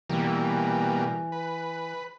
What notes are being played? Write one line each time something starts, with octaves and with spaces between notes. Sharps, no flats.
B2 E3 G3 A#3
B4